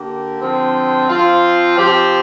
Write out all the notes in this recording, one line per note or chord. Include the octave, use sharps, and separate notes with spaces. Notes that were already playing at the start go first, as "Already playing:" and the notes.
Already playing: D3 A#3 G4
D3 F3 C4
F3 C4 F4
F3 C4 G4